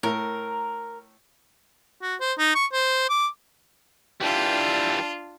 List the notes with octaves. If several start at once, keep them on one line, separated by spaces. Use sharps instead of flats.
A2 A#4
F#4
C5
D#4
C#6
C5
D6
E3 G3 D4 F4